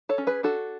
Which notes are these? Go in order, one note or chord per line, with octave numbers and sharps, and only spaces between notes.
A4 C#5
C#4
G#4 B4
D4 F#4 A4